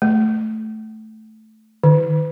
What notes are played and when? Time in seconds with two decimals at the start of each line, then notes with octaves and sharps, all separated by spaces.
0.02 A3
1.84 D#3